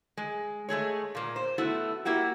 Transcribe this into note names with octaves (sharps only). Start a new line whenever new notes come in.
G#3
G#3 A3 G#4 C#5
A#2 A#3
C5
A3 B3 E4 F#4
A#3 E4 F#4 G4